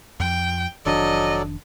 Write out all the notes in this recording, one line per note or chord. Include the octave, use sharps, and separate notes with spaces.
F2 F3 G5
F1 D#3 F#3 D4 A4 D5 D#5